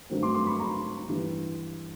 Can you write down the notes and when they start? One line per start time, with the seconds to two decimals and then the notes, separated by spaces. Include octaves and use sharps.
0.10 G2 D#3 F#3 A3 C4
0.23 C6 D6
0.34 C6 D6
0.46 B5 C#6
0.60 A#5 C6
1.08 G2 E3 G3